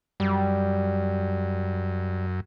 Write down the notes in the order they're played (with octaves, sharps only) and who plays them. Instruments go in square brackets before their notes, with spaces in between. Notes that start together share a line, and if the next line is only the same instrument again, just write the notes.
[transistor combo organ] F#2 [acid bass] G3